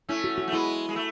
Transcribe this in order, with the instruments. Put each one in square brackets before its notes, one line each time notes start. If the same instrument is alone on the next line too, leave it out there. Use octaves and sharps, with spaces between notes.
[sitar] A3 C#4 [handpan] E4
[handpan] F#4
F#4
[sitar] A3
[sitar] G#3 B3 [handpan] E4
[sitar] G#3
A3